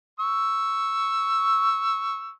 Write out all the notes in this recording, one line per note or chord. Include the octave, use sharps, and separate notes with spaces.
C#6 E6